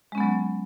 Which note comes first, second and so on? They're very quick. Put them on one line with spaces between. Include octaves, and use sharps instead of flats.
G#3 C#4 B3 F#3